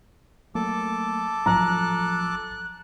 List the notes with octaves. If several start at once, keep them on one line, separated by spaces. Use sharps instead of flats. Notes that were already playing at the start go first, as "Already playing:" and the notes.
F#3 A3 A#3 A4 A5 D6
A1 F3 F#3 A#5 F#6